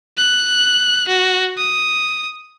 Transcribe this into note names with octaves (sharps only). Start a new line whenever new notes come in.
F#6
F#4
D#6